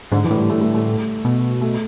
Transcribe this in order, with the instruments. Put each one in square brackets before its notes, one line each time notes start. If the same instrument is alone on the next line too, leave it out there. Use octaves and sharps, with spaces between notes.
[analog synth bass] G#2 [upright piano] D3
[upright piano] E3
[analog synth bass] A2
[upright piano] G3
A3
A3
A3
[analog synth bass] B2
[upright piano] A3